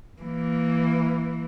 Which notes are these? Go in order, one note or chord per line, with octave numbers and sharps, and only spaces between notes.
E3 A#3